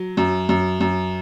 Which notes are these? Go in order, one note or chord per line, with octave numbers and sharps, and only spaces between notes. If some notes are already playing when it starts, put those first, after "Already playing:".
Already playing: F#3
F#2
F#2
F#2